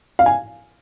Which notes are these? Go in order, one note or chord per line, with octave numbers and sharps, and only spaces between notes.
F5
G#5